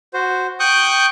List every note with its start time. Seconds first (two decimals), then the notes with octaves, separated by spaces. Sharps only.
0.13 F#4 C5
0.60 G5 C#6 D#6 F#6 G6